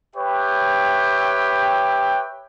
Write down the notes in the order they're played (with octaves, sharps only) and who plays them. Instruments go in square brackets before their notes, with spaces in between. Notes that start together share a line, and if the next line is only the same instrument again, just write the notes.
[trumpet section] G4 B4 C#5 E5 G5